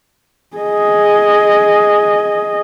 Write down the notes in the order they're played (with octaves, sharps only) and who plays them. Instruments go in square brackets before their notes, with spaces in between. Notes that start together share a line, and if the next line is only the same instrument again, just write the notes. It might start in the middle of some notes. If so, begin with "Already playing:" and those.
[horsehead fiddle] G#4 D#5